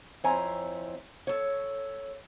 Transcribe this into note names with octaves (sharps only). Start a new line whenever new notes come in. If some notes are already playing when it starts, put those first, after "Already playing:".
F2 C4 E4 C#5 G#5 A#5
A4 C#5